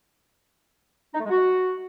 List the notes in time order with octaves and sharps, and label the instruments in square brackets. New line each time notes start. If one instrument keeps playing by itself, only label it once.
[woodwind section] D#4
A3
G#3
F#4